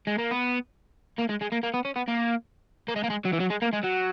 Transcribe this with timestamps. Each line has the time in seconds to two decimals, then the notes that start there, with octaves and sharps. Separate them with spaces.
0.07 G#3
0.19 A#3
0.31 B3
1.19 A#3
1.30 G#3
1.42 G#3
1.52 A#3
1.63 A#3
1.74 B3
1.85 C#4
1.96 B3
2.08 A#3
2.88 A#3
2.96 G#3
3.04 A#3
3.10 G#3
3.25 F#3
3.33 E3
3.40 F#3
3.50 G#3
3.62 A#3
3.73 G#3
3.84 F#3